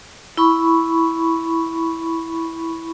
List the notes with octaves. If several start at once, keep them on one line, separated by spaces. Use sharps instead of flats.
E4 B5 C#6